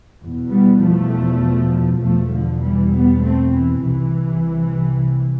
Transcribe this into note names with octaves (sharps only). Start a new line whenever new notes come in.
E2 B2
G3 B3
F3 A3
E2 B2 F3 A3
D3 F3
E3 G3
G3 B3
A3 C4
E3
C2 C3 E3